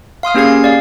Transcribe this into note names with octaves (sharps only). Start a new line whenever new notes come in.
F5 C6 D#6 F6
A#3 C#4 G4 G#4 G#6 C7
D5 F5